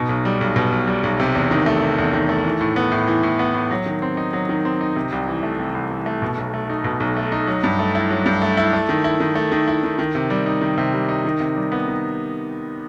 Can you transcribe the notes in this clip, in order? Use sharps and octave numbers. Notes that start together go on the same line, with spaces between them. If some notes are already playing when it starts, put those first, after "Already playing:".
Already playing: B2 D#4
B1
G3
B1
B2
B1
G3
B1
C3
E2
D#3
A3
C3
E2
D#3
A3
E3
A2
B3
A2
E3
A2
B3
A2
F#3
D#3
C4
D#4
F#3
D#3
C4
D#4
C3
C2
E3
A3
C3
C2
E3
A3
B2
B1
A3
D#4
B2
B1
A3
D#4
F#3
G2
A3
E4
F#3
G2
A3
E4
A3
D#3
E4
D#3
A3
D#3
E4
D#3
D#3
C3
G3
D#4
D#3
C3
G3
D#4
D#3
C3
G3
B3
D#3